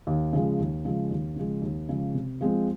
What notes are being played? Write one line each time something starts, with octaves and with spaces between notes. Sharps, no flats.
D#2
C#3 F3 G#3
D#2
C#3 F3 G#3
D#2
C#3 F3 G#3
D#2
C#3 F3 G#3
C3
F3 G#3 C4